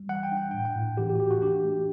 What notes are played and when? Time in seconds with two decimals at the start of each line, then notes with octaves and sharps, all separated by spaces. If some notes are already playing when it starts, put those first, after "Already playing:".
Already playing: G3
0.09 E3 F#5
0.23 G5
0.32 D4
0.37 F#5
0.51 A2 G5
0.65 F#5
0.76 A2
0.97 E3 G4
1.10 G4
1.15 F#4
1.20 E3 G4
1.31 F#4
1.42 D4 G4
1.64 A3